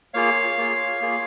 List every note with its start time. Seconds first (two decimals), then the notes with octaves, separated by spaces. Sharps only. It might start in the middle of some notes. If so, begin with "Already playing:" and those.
0.14 A#3 F4 G#4 C#5 F5
0.58 A#3 F4 G#4
1.01 A#3 F4 G#4